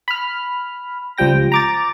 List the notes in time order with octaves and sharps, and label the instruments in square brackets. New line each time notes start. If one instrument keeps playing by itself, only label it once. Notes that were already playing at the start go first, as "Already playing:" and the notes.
[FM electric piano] B5 F6
C#2 F3 G3 G5 A#6
A#5 D6 A6